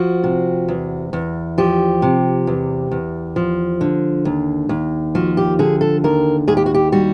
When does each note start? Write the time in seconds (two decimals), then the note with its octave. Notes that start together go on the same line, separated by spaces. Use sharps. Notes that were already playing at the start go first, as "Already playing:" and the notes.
Already playing: F3 F#4
0.24 C3
0.68 E2
1.13 E2
1.58 F3 G4
2.02 C3
2.47 E2
2.91 E2
3.36 F3
3.81 D3
4.25 D#2
4.69 D#2
5.15 F3 F#4
5.37 G4
5.59 D3 G#4
5.81 A4
6.04 D#2 A#4
6.48 D#2 G#4
6.57 G4
6.66 F#4
6.74 G4
6.92 G3 F#4